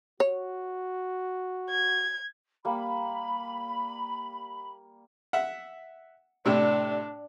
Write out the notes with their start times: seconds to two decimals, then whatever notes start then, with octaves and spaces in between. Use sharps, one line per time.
0.20 F#4 C#5
1.70 G#6
2.65 G3 A#3 B5
5.33 E5 F#5
6.46 A2 C3 D4